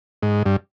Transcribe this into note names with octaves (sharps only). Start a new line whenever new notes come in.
G#2
G2